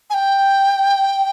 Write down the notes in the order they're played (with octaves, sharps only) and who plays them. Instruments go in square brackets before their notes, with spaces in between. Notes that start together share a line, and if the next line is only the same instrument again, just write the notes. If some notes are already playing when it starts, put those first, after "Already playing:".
[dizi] G#5
G5